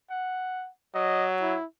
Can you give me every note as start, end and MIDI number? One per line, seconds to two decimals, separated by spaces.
0.10 0.69 78
0.95 1.56 54
0.95 1.26 75
1.42 1.65 64